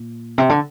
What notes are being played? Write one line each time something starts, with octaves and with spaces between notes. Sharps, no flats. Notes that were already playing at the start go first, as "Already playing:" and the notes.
Already playing: A#2
C3
D3